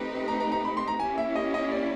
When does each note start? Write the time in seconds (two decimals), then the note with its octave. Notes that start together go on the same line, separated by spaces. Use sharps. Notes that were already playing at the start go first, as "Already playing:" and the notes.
Already playing: A3 C4 D#4 G4 B4
0.28 A#5
0.40 A#5
0.52 A#5
0.65 B5
0.77 C6
0.88 A#5
1.00 A#3 C#4 E4 G4 G#5
1.18 E5
1.35 D#5
1.54 D#5
1.72 D5